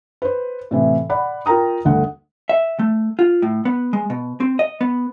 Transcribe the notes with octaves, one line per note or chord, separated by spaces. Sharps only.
B4 C5
A2 C3 E3
D5 F#5 B5
F4 A#4 G5 A#5 D#6
G1 D2 F#5
E5
A3
F4
A2
B3
G#3
B2
C4
D#5
B3